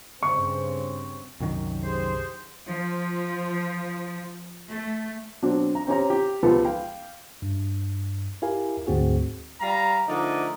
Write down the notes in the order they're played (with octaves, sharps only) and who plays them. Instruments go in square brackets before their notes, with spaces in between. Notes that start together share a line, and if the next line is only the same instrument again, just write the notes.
[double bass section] G2 C#3 C4 [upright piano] C#6
[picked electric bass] C2 F#2 D#3
[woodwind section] G4 G#4 C5
[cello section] F3
A3
[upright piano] B2 F#3 C4 D4
A#5
C4 C#4 G4 A#5
G4
C#2 F3 B3 F4 G4 A4
F5 G5
[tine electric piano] G2
E4 G4 A#4 F5 G#5
D2 G#2 C4 F#4 G#4
[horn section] G3 F5 A#5
D3 F3 A3 D#4 A#4 D5